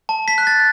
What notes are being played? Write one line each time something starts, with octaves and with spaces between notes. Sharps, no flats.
A5
B6
F#6
A6